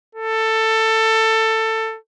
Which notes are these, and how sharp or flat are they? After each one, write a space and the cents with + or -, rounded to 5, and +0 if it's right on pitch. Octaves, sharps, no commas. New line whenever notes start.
A4 +15